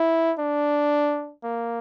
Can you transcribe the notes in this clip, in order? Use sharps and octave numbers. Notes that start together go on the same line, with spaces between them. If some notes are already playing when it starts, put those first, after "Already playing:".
Already playing: E4
D4
A#3